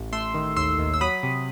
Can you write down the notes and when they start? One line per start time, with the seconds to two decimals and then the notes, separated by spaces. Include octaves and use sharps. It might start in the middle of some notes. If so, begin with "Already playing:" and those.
Already playing: A1
0.12 A3 C6 E6
0.34 D#3
0.56 D#2 C6 E6
0.79 D#2
0.94 E6
1.01 F#3 B5 D#6
1.23 C3